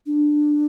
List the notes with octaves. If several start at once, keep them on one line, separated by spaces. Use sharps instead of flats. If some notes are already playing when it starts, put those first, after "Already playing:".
D4